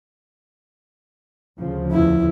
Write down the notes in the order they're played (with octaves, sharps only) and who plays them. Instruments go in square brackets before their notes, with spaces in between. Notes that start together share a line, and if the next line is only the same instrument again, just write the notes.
[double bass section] D2 C#3 F3
[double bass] E2 E4